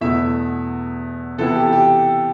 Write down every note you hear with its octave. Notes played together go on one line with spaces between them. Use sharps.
E2 B2 A3 E4 E5
C3 E3 B3 E4 A4
G4
G4